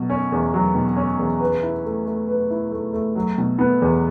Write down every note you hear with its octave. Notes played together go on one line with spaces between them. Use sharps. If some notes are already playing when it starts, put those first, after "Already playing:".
Already playing: B2 F#3
C#4
E2
F#3
B2
C#4
E2
B4
E4
A3
A3
B4
E4
A3
A3
F#3
B2
B3
E2